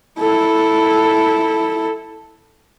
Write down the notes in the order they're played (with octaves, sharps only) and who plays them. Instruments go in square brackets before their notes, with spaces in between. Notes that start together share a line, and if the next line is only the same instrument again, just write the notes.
[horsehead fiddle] E4 A4